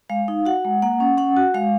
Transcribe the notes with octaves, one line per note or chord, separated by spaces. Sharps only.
G#3 F5
D#4
F#4 F#5
G#3
A#3 F#5
C#4
C#4 F#5
F#4
G#3 F5